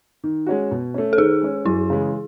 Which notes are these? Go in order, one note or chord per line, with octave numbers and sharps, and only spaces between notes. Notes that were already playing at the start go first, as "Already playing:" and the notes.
D#3
G#3 C#4 F#4
B2
A3 C#4
A4
D#3 G#4
G#3 C#4
F#2 E4
C#3 E3 G#3